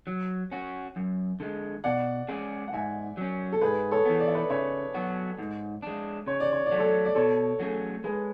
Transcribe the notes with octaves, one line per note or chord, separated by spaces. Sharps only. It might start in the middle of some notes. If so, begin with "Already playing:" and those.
F#3
C#4 F#4
F#2
D3 G#3
B2 D5 F#5
G#3 C#4 G#4 D5
F#5
G#2 E5 G#5
F#3 C#4
A4
G#2 G#4 B4
A4 C#5
E3 B3
D5
E5
B4 D5
C#3 C#5 E5
F#3 B3 F#4
G#2
G#3 D4
C#3 C#5
D5
C#5
D5
F#3 A3
A4 C#5
D5
B2 A4 C#5
F#3 A3 C#4 G#4
G#3 G#4 B4